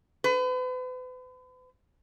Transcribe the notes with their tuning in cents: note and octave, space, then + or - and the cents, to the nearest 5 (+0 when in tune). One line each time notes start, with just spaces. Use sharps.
B4 +40